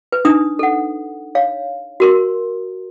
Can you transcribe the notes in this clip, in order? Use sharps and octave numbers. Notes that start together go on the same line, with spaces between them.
B4
D4 D#4 D#6
A4 F#5
C#5 F5
F#4 A#4 C6